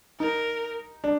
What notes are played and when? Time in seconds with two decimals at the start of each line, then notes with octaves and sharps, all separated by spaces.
0.20 D#4 A#4
1.04 D4